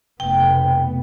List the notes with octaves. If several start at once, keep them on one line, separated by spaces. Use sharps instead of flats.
F1 B2 B3 G5